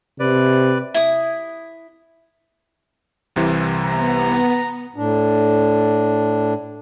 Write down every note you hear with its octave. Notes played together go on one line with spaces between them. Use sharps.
C3 B4 D5
E4 D#6
C2 C3 E3
B3 A#5
A2 D4